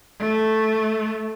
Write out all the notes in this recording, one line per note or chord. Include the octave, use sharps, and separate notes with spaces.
A3